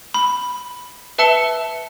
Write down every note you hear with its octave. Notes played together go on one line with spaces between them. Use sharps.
B5
B4 E5 A5 E6 C#7 G7